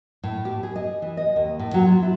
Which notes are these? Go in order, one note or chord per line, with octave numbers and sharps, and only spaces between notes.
A2
G4
G#4
D#5
E3
D#5
D#2
A2
F#3
F4
E4